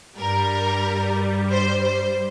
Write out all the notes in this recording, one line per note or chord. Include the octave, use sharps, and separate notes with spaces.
G2 G3 A#4
C5
C5